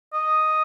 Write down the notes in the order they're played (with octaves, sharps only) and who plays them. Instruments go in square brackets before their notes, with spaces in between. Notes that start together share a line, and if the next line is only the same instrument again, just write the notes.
[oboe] D#5